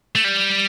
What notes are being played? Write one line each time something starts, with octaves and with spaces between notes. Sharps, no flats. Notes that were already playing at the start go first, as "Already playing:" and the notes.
A3
G3